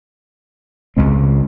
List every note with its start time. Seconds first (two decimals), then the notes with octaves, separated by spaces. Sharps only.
0.97 C#2 C#3 G#3 C4